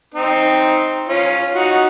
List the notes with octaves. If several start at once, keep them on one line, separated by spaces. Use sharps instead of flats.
C4 D#4
C#4 F4
D#4 F#4